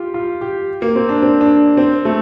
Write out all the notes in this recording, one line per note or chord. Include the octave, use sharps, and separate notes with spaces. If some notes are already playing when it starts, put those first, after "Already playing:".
Already playing: F4 G4
F4
G4
A#3
C4
D4
C4
D4
C4
A3